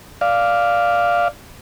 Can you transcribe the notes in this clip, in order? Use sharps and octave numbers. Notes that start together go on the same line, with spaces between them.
D5 F5